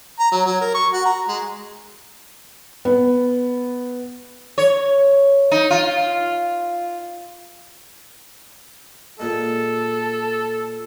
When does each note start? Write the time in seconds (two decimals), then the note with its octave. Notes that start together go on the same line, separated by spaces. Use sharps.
0.19 A#5
0.32 F#3
0.46 F#3
0.61 A#4
0.74 C#6
0.93 F#4
1.05 A#5
1.28 G#3
2.85 B3
4.58 C#5
5.51 D#4
5.70 F4
9.19 A#2 G#3 A4